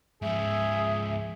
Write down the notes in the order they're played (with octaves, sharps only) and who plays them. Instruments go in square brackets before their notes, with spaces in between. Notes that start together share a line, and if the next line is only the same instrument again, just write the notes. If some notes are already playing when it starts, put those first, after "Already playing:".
[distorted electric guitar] G#2 F3 [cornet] G#4 [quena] E5